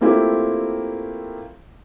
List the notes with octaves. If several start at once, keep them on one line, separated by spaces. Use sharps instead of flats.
A3 A#3 C4 E4 F4 G4